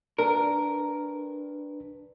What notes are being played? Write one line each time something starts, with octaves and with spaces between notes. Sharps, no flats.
D4 A#4 B4